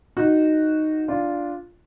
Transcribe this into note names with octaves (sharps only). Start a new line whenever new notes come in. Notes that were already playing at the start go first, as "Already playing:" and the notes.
D#4 F#4
D4 F4